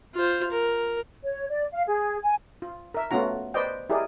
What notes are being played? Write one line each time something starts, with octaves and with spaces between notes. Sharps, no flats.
F4 C5
A#4
C#5
D5
F5
G#4
G#5
F4
A#4 E5
A3 B3 C#4 F4 F#4 A#5
B4 C5 D5 D#5 G5
E4 G4 G#4 A#4 D5 D#5